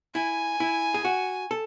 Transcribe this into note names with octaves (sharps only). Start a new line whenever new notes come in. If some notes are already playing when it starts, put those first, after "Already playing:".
E4 G#5
E4
G#4
F#4
A4